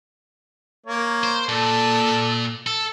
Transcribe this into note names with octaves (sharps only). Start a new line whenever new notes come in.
A#3 C#5
C5
A#2 A4 D5
A4